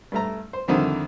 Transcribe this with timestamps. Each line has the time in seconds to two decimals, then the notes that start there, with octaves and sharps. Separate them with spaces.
0.12 G2 A3 A#5
0.53 C5
0.68 C2 F2 D3 D#3